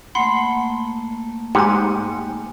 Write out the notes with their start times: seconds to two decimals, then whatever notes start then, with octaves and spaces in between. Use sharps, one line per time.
0.15 A3 A#3 F#5 B5 C6
1.55 G#2 G4 G#5 C#7